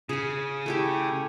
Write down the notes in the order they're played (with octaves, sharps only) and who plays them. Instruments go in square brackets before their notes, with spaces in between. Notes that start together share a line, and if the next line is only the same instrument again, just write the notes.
[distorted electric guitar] C#3 [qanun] G#4 G#5
[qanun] A3 E4 G4